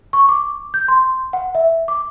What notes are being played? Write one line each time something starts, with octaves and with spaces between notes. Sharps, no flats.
C#6
D6
G6
C6
F#5
E5
D6